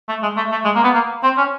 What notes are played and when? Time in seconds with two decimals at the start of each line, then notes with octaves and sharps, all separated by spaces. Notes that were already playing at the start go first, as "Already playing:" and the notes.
0.09 A3
0.23 G#3
0.37 A3
0.52 A3
0.65 G#3
0.75 A#3
0.84 B3
0.94 A#3
1.23 C4
1.38 C#4